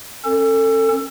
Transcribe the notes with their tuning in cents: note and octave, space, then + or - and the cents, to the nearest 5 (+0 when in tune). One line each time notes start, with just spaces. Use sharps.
C#4 -35 A4 +25